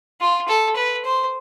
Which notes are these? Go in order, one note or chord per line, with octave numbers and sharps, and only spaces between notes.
F4
A4
B4
C5